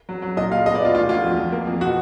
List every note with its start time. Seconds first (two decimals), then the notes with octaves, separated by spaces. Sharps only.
0.09 F#3
0.22 F#3
0.37 A#2 D#5
0.51 A#2 F5
0.66 B3 D#5
0.75 D5
0.80 B2 F4
0.94 D2 F4
1.09 D2 F4
1.24 F2
1.37 F2
1.52 A#3
1.67 F2
1.81 B2 F#4